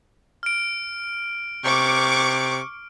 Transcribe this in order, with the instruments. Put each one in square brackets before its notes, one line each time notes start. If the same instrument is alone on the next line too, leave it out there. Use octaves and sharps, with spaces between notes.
[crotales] F6 D7
[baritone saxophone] C3 [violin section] C#6 D6